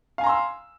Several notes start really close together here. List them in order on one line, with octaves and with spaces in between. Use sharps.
F5 G#5 A#5 C6 E6